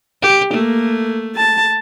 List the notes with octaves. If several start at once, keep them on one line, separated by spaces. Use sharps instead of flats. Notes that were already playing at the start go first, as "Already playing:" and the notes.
G4
A3 A#3
A5